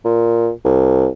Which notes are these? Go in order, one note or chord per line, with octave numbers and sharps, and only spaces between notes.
A#2
C2